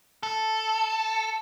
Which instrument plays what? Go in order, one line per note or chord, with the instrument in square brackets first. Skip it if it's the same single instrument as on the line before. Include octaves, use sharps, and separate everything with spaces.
[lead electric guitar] A4